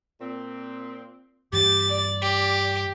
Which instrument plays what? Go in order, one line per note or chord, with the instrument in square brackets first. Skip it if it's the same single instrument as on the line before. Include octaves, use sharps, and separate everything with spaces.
[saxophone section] A#2 C4
[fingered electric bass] G2 E3 [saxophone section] G4 [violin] A6
[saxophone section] D5
[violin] G4